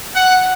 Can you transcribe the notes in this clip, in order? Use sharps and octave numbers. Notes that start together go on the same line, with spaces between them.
F#5